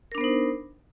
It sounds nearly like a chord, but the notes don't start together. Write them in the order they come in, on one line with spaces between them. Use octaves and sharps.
A#4 D4 B3 C5 D#4